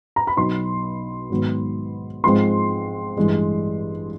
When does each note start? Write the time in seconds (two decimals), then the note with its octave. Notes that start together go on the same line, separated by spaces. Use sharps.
0.16 A#5
0.27 B5
0.37 B1 B2 F#3 B3 D#4 C6
1.30 G#2 D#3 F#3 B3
2.24 G#2 F3 G#3 C4 C6
3.16 A1 G2 E3 G#3